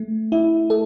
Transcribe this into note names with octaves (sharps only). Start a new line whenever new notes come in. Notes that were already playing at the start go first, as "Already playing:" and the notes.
Already playing: A3
E4
A4